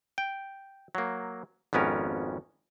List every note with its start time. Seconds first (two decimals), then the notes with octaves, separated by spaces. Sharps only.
0.18 G5
0.95 F#3 A#3
1.73 G#1 F2 B3 C#4 A#4